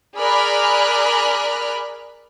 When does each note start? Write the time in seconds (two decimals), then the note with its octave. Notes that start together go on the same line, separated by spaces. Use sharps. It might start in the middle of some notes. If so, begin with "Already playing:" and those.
0.17 G#4 A#4 D5 B5 F6 F#6